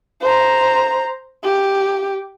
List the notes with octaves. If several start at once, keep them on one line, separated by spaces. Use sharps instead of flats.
C5 A#5
G4